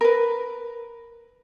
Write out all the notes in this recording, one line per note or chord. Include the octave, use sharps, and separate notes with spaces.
A#4 B4